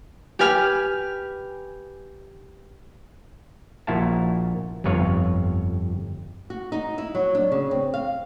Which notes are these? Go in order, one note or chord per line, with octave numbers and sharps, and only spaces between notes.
G4 B4 G#5 F6
A#1 A#2 E4 F#4 F5 A5
G1 F2 B4 C#5 F5
F#4
D#4
E4
F#3
D4
C#3
C4
F5